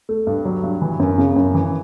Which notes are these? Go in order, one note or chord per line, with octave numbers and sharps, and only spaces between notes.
A3
G2
F#3
G2
E3
F#2
C#3
F#2
E3